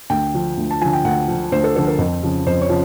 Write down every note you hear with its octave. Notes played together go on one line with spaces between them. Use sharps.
D2 G5
D3 F3
D2
A5
D3 F3 G#5
G5
D2 F#5
D3 F3
D2 C5
A4
D3 F3 A4
A#4
F2
C#3 F3
F2 C5
C#5
C#3 F3